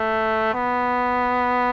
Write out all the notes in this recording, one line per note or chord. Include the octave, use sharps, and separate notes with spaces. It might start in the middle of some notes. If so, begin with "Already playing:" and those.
Already playing: A3
B3